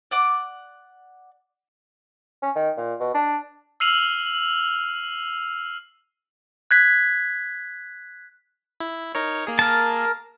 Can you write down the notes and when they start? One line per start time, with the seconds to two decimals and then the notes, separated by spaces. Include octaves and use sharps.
0.11 D5 F#5 D6
2.42 C#4
2.55 D#3
2.77 A#2
3.00 B2
3.14 D4
3.80 E6 F6 C7 D#7 F7 F#7
6.71 F#6 G#6 B6
8.80 E4
9.15 D#4 A#4 C#5
9.47 A#3 G#4
9.59 A#4 A5